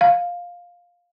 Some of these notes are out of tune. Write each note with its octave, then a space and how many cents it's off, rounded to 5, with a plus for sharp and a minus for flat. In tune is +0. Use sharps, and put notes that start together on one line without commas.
F5 +10